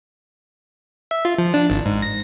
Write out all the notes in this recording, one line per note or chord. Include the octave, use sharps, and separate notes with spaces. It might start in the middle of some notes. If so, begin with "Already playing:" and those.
E5
F4
F3
D4
G#1
G#2
A#6